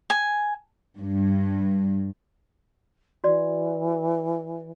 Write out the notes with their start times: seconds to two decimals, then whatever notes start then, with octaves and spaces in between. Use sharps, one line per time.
0.10 G#5
0.98 G2
3.24 E3 F#4 D5